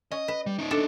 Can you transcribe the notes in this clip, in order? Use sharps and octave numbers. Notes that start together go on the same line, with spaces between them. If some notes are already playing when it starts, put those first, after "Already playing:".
C#4 D#5
B4
G3
C#4 D#4
D4 A4